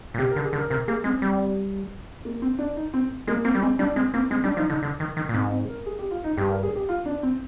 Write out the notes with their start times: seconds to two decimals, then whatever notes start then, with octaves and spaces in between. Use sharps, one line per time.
0.14 A#2
0.18 C3 G4
0.31 A#4
0.36 D3
0.45 G#4
0.53 D3
0.58 A#4
0.70 C3 A#4
0.87 A#3 G#4
1.04 G#3 C4
1.22 G3
2.25 A#3
2.42 C4
2.59 D4
2.76 D#4
2.94 C4
3.27 G#3 A#3
3.45 A#3 C4
3.54 G3
3.62 G#3 C4
3.79 G3 D4
3.96 G#3 C4
4.14 A#3 C4
4.30 G#3 C4
4.44 G3 D4
4.57 F3 D#4
4.69 D3 D#4
4.83 D3
5.00 D#3
5.17 D#3
5.29 A#2
5.34 G#2 C4
5.51 C4
5.69 A#4
5.86 G#4
5.99 G4
6.11 F4
6.24 D#4
6.37 G2 G4
6.50 A#4
6.63 G#4
6.75 G4
6.89 F4
7.06 D4
7.23 C4